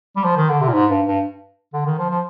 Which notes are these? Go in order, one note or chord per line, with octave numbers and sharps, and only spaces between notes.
G3
F3
D#3
D3
C3
A#2
G#2
G2
G2
D3
D#3
F3
F3